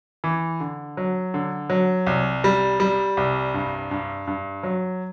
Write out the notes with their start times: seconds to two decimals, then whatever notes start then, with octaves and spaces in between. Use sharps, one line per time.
0.24 E3
0.60 D3
0.97 F#3
1.34 D3
1.70 F#3
2.07 C2
2.44 G3
2.80 G3
3.17 C2
3.54 G2
3.91 G2
4.27 G2
4.63 F#3